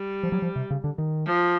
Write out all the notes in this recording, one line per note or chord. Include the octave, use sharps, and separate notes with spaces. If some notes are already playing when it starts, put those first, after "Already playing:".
Already playing: G3
F3
F#3
F3
C3
C#3
D3
D#3
F3